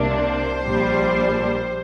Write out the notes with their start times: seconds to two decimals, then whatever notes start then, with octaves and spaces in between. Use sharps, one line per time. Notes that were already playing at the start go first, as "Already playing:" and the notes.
Already playing: C2 C3 A#3 D4
0.15 C5
0.65 A#1 A#2 G3 D4